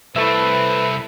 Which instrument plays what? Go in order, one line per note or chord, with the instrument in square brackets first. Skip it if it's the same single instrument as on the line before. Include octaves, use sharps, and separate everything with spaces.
[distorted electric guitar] C2 C4 [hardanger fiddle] E4 A5 [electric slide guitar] A4 E5 [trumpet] B4